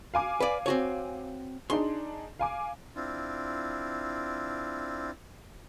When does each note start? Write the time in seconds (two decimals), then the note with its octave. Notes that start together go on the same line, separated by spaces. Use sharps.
0.14 F5 G#5 D6
0.40 B4 D5
0.66 C4 F#4 C#5
1.70 D4 D#4 G#4 C6
2.39 F5 G#5 D6
2.96 C4 D4 E4 F4